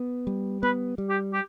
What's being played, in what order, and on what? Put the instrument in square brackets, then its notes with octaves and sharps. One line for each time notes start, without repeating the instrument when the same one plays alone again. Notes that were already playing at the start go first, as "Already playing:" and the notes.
Already playing: [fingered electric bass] B3
G3
[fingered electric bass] B3 [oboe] B4
[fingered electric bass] G3
[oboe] G4
G4